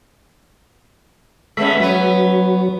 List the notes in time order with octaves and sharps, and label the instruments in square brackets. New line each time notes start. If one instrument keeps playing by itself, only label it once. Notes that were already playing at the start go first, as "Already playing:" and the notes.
[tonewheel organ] G#3 E5 B5 [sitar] A3 B3 C#4
[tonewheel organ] F#3 [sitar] B3 B4 C#5